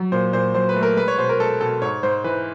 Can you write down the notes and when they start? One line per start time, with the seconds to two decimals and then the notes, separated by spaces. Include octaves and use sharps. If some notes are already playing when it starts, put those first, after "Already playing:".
Already playing: F#3
0.12 A#2 C5
0.33 A#2 C5
0.55 F#3 C5
0.69 B4
0.76 A3
0.83 A#4
0.97 G#3 B4
1.08 C#5
1.18 B2 C5
1.29 A#4
1.39 G#3 A4
1.61 B2 A4
1.82 G#2 C#5
2.03 G#2 C5
2.24 E3 B4